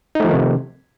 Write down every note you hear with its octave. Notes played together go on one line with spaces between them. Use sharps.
C3 D#3 F3 A3 D#4